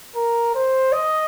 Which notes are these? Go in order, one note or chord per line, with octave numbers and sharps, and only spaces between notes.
A#4
C5
D#5